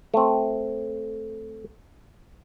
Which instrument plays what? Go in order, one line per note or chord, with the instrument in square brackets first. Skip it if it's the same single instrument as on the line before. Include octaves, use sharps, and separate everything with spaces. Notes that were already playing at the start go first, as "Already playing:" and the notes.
[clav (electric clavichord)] A3 C4